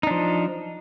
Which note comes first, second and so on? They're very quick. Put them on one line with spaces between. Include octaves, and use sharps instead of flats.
D#4 D4 F3